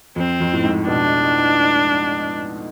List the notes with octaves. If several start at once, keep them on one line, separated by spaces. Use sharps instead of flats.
F2 C4
F2
A2
G#2
B2 D4